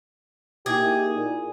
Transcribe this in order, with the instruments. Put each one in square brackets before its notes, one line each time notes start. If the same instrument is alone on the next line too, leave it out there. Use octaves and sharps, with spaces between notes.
[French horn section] A#3 D#4 E4 [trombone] G4 [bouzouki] G#4
[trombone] A#2